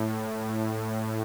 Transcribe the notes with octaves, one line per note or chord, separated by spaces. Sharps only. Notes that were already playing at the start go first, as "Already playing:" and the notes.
Already playing: A2